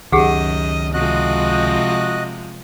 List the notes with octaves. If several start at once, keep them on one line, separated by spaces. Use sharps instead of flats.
C#2 F#2 D#3 G4 G#4 D#5 F#5
C3 F3 G#3 F#4 D#5 F#6